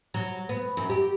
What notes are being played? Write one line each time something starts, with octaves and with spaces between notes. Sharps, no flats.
F#3
B3
F#2
G4